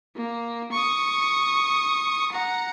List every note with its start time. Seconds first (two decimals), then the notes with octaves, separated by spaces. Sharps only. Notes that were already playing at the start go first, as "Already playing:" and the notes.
0.16 A#3
0.72 C#6 D#6
2.32 F#5 A#5